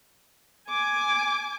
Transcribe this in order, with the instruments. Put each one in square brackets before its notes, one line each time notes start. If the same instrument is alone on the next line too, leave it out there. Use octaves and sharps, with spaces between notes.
[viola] G#5 D6